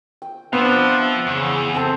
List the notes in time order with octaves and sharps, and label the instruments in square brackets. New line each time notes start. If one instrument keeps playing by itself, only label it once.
[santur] G5
[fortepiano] B3 [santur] C4 G5 [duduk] D4 [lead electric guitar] C5 F5
[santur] E5
[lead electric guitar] E2 [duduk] C#3
[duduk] C4 [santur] A4 E5 F#5